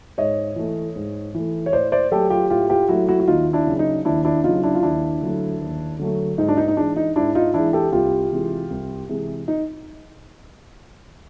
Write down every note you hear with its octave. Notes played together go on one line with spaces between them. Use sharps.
G#2 C#5 D#5
E3 A3
G#2
E3 A3
C#5
A2 C5 D5
C5 D5
F#3 A3 G4 A4
F4 G4
A2 F4 G4
F4 G4
F#3 A3 E4 F#4
E4 F#4
F#4
D#2 D#4 F4
D4 E4
C#3 F#3
D#4
D#2 D4 E4
D4 E4
C#3 F#3 D#4 F4
D4 E4
F4
D#2 D4 E4
D3 F#3 A3
D#2
D3 F#3 A3
G#2 D#4
D4
D#4
D#4
E3 G#3 D4
D#4
G#2 D4 E4
D#4 F4
E3 G#3 D4 E4
G4 A4
C2 F4 G4
C3 E3 G#3
C2
C3 E3 G#3
D#4